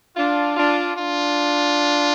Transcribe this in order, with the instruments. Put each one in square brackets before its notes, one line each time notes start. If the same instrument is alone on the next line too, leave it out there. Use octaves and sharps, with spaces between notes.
[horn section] D4 F4
D4 F4
D4 F4